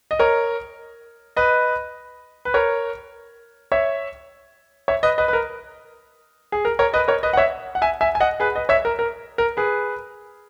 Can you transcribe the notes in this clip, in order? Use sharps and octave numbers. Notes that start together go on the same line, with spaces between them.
D#5
A#4 C#5
B4 D#5
B4
A#4 C#5
C#5 E5
C#5 E5
B4 D#5
B4 D#5
B4
A#4
G#4
A#4
A#4 C#5
B4 D#5
A#4 C#5
B4 D#5
F#5
C#5 E5
F#5
E5 G#5
E5 G#5
G#5
D#5 F#5
G#4 B4
B4 D#5
C#5 E5
A#4
A#4
A#4
G#4 B4